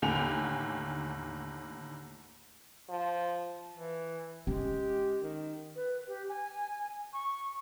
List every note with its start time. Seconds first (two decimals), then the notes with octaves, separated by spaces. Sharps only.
0.02 D#2 A2 D3 G5 G#5 F7
2.90 F3
3.75 E3
4.47 G#3 C#4 G4
5.22 D#3
5.76 B4
6.08 G4
6.29 G#5
7.13 C#6